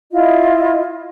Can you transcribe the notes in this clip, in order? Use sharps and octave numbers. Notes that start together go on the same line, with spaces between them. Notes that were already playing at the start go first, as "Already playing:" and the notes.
E4 F4 D#5